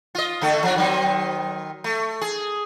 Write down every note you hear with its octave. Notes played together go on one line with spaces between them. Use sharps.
F4 D#5
D3 A3 A4
F3 F#3 D4
D#3 F#3 C4
A3
G#4